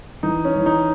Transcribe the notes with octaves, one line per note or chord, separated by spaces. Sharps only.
E3 D#4
C#4
E3
D#4